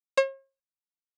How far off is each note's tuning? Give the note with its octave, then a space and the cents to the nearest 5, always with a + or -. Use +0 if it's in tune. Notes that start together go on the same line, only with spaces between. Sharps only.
C#5 -45